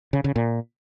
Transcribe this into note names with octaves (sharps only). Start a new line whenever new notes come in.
C#3
C#3
A#2